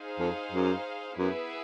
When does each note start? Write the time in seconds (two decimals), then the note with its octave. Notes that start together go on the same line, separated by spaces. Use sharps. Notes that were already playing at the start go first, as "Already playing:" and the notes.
Already playing: D#4 G#4 C5 F5
0.19 F2
0.52 F#2
1.18 F#2 B3 E4 G#4 B4 E5